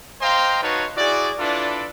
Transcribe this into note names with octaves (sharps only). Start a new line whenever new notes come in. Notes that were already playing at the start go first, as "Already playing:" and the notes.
C5 D#5 F5 G5 A#5 C6
D#4 F#4 B4 C#5 F5 A5
E4 F#4 G#4 D5
D4 E4 F4 A4 B4 D5